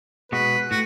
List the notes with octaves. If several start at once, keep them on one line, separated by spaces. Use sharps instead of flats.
B2 G#3 F#4 B4
A2 F#4